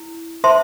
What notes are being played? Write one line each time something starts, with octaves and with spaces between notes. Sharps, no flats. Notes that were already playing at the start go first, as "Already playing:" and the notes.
Already playing: E4
C5 E5 A5 C6